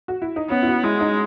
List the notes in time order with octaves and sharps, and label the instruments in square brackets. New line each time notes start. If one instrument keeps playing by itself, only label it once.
[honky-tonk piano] F#4
E4
D#4
[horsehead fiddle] B3 [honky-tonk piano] C#4
[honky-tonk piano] E4
F#4
[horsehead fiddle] G#3 [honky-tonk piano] E4
[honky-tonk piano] D#4